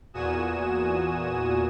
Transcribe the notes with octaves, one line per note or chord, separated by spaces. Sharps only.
E2 A#2 F#4 G#5 D#6 E7